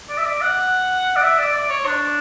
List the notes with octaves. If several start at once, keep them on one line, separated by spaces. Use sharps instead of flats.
D5
E5
D5
F#5
D5
E5
D5
D5
C#5
D4